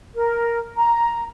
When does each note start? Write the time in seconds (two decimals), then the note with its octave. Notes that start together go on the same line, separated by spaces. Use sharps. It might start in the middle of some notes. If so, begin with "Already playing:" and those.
0.15 A#4
0.76 A#5